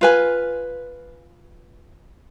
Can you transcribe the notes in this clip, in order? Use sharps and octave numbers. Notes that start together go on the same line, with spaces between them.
F4 B4 G#5